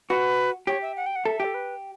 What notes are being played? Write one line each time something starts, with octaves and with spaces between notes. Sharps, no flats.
F#4 B4
G4 C#5
E5
F#5
G5
F#5
A4 E5
G4 A4
B4